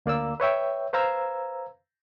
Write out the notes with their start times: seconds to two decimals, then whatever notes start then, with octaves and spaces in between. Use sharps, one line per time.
0.06 D2 A#3 D5 E6
0.40 B4 C#5 E5 G5
0.93 B4 C5 F5 A#5 E6 G#6